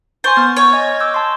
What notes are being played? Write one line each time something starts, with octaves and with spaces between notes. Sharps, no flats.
C5 G#5 C#6 A6
B3 F6 A6
C#5
D#5 G#5 G#6
D6 E6 G6
A5 C6